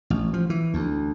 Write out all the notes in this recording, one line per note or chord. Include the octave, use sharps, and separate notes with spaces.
A1
F3
E3
D2